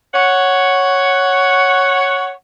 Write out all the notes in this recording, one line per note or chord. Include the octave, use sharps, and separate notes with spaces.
C#5 F#5